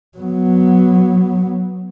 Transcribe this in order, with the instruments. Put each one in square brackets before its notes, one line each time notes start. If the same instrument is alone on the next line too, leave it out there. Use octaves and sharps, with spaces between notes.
[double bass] F#3 B3